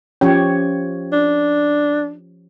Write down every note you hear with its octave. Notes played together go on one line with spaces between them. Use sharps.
F3 C#4 G4 C#5
D4